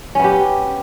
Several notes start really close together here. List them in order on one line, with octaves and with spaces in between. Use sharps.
C#4 B3 G4